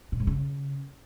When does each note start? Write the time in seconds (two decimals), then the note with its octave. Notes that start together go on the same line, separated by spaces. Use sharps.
0.12 A#2
0.20 G#2
0.27 C#3